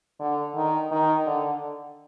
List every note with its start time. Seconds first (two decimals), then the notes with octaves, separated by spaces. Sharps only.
0.20 D3
0.55 D#3
0.91 D#3
1.26 D3